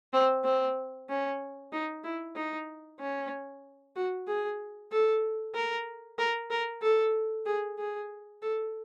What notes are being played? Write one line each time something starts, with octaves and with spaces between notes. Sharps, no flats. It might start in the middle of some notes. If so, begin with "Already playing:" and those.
C4
C4
C#4
D#4
E4
D#4
C#4
F#4
G#4
A4
A#4
A#4
A#4
A4
G#4
G#4
A4